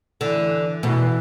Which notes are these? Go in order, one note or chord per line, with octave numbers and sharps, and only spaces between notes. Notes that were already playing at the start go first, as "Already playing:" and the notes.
D3 E3
B2 E3